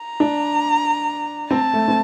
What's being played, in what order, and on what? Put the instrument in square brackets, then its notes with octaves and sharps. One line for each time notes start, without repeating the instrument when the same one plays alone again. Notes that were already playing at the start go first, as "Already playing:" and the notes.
Already playing: [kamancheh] A#5
[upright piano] D4
[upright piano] C4 [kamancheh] A5
[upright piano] A3
C4